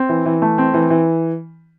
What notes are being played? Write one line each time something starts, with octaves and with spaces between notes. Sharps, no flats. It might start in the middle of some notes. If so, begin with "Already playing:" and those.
Already playing: C4
E3
E3
A3
C4
E3
E3